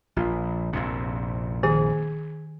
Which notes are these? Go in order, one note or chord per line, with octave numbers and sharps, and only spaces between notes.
A#1 F4
A#1 F2 C3
D#3 G#4